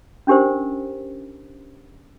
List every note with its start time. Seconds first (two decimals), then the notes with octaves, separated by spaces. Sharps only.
0.27 C#4 D4 G4 A#4 C5